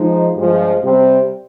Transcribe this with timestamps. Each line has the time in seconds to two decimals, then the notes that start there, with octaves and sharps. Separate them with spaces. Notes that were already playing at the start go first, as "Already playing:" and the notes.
Already playing: F3 G#3 D#4
0.37 G2 F3 G#3
0.82 C3 G3 C4